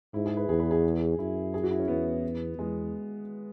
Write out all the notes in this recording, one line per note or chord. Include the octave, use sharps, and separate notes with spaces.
G#2 E4
G#4
B4
E2 G#4
B4
G#4
F#2 E4
G#4
F#4
E4
C#4
E2 B3
E2 G#3